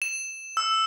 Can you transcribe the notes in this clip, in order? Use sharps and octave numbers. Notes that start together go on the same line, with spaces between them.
E7
E6